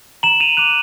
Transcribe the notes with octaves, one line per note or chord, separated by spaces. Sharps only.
A#5 E7 F#7
D#7 F7
D6 F#6 D#7 F7